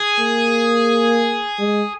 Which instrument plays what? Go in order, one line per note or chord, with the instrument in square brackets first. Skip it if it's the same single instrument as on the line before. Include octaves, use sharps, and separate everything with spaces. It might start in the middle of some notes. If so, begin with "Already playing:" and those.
Already playing: [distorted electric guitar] G#4
[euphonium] A#3
G#3